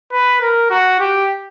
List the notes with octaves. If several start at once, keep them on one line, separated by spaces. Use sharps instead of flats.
B4
A#4
F#4
G4